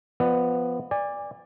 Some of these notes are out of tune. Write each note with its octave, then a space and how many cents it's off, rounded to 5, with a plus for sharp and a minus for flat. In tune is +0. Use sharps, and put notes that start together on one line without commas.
F3 +0 B3 +5 D5 +45
D5 +0 G#5 -35